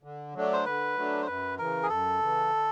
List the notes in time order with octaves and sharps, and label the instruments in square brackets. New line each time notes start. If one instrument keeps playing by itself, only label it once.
[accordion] D3
F#3 A3 D4
[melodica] C5
[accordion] D3 [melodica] B4
[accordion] F#3 A3 D4
[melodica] C5
[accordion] F#2 [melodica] B4
[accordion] C#3 E3 [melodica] A#4
[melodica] G#4
[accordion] F#2 [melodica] A4
[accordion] C#3 E3
D3